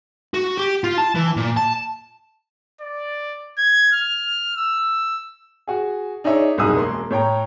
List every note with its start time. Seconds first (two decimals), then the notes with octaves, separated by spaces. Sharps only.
0.34 F#4
0.57 G4
0.84 F4
0.98 A5
1.15 E3
1.37 A#2
1.57 A5
2.81 D5
3.58 G#6
3.93 F6
4.57 E6
5.68 F#4 G#4
6.24 D4 D#4 G#4 C#5 E5
6.57 F#1 C2 B2 D#4 G#4 D#6
6.76 E1 A#3 C6
7.11 A2 C#5 G5 A#5